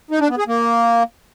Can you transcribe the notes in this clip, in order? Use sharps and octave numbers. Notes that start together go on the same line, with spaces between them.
D#4
D4
B3
G#4
A#3